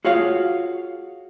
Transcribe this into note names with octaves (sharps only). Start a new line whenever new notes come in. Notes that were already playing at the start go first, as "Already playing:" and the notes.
F4 F#4 G#4 C#5 F5